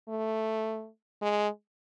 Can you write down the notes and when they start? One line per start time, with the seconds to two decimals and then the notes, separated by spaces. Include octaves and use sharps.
0.09 A3
1.22 G#3